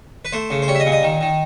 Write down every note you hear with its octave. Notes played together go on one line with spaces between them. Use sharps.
B4
A3 C5
C#3
C5
G3 C#5
E5
D#5
A#2
D#5
D#3
D#3